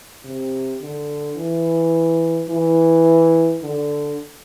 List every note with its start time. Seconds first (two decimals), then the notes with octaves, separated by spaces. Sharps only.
0.25 C3
0.81 D3
1.37 E3
2.49 E3
3.62 D3